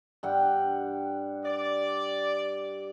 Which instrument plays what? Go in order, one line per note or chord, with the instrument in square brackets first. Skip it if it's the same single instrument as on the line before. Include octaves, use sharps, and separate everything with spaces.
[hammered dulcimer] G2 F#5 G5
[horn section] D5